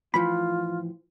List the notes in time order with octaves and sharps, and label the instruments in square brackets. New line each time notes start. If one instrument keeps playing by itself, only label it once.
[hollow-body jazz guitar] A2 E3 F3 [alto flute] F4 [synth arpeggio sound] B5